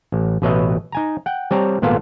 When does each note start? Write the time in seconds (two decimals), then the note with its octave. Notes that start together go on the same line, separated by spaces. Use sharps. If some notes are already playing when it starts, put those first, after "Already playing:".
0.12 A1
0.42 A1 B2 B4 C#5 D#5 E5
0.92 D#4 G#5 A#5
1.26 F#5 G5
1.51 G3 C4 C#5 A5 A#5
1.82 G#1 A#2 B3 F4 A4 F5